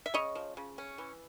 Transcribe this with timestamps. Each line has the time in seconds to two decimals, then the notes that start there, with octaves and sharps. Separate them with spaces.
0.06 E5
0.14 C#3 C#5 D#5
0.35 F3
0.57 C#3
0.78 C#4
0.98 E3